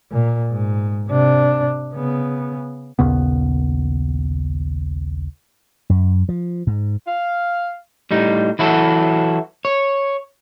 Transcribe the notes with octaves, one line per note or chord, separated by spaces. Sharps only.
A#2
G#2
C3 D4
C#3 B3
A#1 D#2 C#3 B3
F#2
F3
G#2
F5
A2 G3 D#4
E3 F#3 E4 F#4 A4
C#5